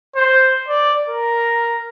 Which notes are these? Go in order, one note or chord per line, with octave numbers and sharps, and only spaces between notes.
C5
D5
A#4